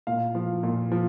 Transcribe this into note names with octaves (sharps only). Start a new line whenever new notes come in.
A#2 F5
F3
A#2
F3